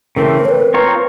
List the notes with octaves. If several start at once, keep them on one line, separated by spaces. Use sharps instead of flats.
C#3 E3 A3 C4 A#4
C#5
B4
C4 F4 A#4 C#5